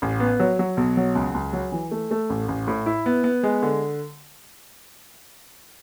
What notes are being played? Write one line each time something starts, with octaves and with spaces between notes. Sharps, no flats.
A1
B3
F#3
F#3
B1
F#3
C#2
C#2
F#3
E3
A3
A3
A1
A1
A2
E4
B3
B3
G#3
D3